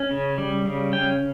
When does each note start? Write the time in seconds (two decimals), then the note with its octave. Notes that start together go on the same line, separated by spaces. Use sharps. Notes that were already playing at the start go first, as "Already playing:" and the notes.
Already playing: C#4
0.11 C#3
0.38 G3
0.65 C#3
0.93 C#4 G5